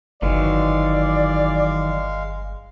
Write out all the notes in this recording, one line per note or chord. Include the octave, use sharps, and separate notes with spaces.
G1 D#3 E3 F#3 G#3 D5 F5